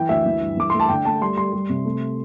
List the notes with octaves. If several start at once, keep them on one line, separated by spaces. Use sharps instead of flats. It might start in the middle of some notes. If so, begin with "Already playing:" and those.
Already playing: E3 G5
D2 E5
E3
G2
E3 D6
A3 C6
A5
D3 G5
A3 A5
G3 C6
G3 C6
G3
C3
A3